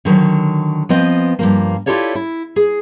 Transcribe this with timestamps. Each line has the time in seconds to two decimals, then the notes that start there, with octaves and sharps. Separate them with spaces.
0.05 D3 D#3 F3 F#3
0.89 F3 B3 C4 D#5
1.39 G2 F3 A#3
1.86 E4 F4 G4 A4 C#5 D5
2.15 E4
2.56 G#4